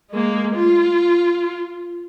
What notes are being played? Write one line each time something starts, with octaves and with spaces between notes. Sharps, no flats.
G#3 A#3
F4